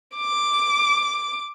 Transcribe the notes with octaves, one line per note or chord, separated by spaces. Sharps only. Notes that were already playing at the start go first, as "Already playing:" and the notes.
D6